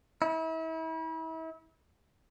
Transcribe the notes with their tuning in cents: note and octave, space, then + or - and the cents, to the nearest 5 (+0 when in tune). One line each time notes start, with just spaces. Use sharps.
E4 -35